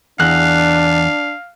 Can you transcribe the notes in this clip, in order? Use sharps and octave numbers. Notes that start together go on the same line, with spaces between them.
E2 D4 F5 F#6